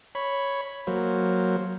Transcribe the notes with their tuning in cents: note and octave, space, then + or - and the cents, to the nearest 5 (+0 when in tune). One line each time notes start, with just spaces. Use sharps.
C#5 +0 B5 +0
F#3 +0 A#3 +0 C5 +0